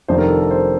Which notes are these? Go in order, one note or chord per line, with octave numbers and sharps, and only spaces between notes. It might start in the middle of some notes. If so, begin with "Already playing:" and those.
F1 F2 D#3 G3 D4 C5
A#4
A4
A#4
C5